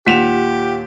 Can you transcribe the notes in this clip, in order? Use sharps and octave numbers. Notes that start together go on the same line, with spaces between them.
D#2 A#2 F4 G4 F#5 B6 E7 F7